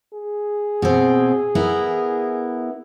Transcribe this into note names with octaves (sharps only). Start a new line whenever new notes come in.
G#4
B2 C4
B3 E4 A#4